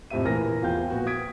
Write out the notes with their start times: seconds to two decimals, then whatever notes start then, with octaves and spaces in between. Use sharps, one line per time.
0.10 F2 A2 C3 G4 E5 D#7
0.25 A#1 E3 A#4 F6 A#6
0.62 E2 F3 F5 G5 G6
0.90 A#2 B3 F#4
1.07 D#6 G#6 B6 D7